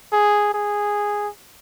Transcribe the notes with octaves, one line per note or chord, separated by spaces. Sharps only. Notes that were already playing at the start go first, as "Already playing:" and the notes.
G#4
G#4